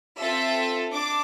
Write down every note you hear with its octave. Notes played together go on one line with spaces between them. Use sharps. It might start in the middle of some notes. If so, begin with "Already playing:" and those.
C4 F4 A4 E5
D4 D6